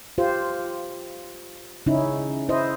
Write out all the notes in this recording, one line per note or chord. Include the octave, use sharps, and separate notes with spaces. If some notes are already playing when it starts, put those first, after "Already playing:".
F4 G4 C5
C#3 C#4 D#4 E4
E4 C5 D#5